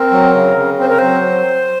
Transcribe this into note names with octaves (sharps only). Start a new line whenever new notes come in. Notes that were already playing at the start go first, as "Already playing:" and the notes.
Already playing: C4 A#4
F#3
C#3
C#3
C4 C5
A#4
F#3 C5